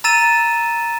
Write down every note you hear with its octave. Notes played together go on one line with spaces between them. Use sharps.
A#5 E6 A6 D#7 E7